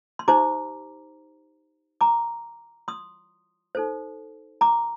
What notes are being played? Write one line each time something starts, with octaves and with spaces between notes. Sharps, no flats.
C6
D#4 G4 C5 A#5 D6
A#5 D6
C6 D#6
D#4 A4 C5
A#5 D6